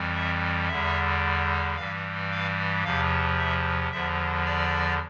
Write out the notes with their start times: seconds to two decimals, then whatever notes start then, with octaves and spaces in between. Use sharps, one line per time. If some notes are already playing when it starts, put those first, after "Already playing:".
Already playing: F2 E3 G3
0.15 E5
0.68 E2 D3 G3 E5
1.76 G2 E3 G3 F5
2.30 F5
2.83 E2 C3 F3 F5
3.38 E5
3.91 E2 D3 F3 E5
4.45 D5